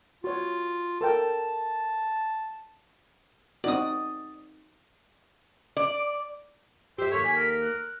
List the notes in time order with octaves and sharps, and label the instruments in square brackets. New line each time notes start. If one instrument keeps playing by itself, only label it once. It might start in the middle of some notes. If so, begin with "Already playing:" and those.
[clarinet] F4 [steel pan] F#4 C#5
[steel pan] A4 A#4 G5 [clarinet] A5
[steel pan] C4 D#4 F#4 [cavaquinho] D5 D#6
[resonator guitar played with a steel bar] D5
[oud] G4 E5 [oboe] C5 [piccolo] E6
[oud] D#2 A#3 A4 [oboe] C#5 [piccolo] B6
[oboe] G#5
A#4
[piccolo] F#6